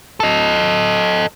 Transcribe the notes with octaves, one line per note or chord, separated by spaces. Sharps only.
A4 D#5